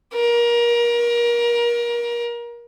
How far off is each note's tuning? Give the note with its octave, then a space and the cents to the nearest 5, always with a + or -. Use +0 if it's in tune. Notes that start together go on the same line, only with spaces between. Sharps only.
A#4 +30